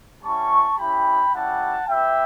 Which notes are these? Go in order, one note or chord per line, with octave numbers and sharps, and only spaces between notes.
G3 C#4 E4 A5 C#6
C#4 E4 G4 G5 B5
G3 C#4 E4 G4 F#5 A5
B3 E4 G4 E5 G5